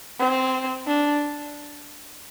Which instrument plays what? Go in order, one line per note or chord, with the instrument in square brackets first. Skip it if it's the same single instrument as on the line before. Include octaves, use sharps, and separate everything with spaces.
[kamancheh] C4
D4